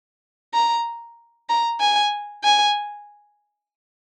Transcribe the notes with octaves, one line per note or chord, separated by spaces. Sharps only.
A#5
A#5
G#5
G#5